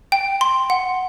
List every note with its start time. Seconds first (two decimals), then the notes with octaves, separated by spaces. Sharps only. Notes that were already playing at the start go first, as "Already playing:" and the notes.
0.12 G5
0.41 C6
0.70 F#5